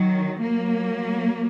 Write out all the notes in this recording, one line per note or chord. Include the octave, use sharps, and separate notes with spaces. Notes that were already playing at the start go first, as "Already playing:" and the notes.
Already playing: D#3 F#3
F#3 A#3